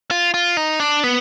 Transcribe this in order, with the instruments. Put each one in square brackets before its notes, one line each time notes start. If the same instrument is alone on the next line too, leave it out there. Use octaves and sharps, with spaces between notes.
[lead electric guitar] F4
F4
D#4
D4
B3